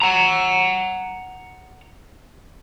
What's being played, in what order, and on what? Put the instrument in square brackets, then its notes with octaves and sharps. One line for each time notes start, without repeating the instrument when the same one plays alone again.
[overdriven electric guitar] F#5 A#5